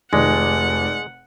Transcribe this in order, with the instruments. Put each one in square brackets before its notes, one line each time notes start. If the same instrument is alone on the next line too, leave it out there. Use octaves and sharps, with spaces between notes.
[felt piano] F1 [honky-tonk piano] D#3 D5 [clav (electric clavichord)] G#3 [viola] F#5